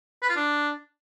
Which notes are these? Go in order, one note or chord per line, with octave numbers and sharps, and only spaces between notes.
B4
F4
D4